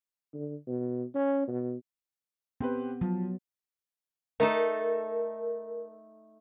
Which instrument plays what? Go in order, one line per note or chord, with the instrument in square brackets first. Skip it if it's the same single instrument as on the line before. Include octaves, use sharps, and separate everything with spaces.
[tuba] D3
B2
C#4
B2
[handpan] B3 [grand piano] C4 G4 B4
[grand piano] F3 [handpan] F#3
[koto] A3 D#4 A4 [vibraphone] A#4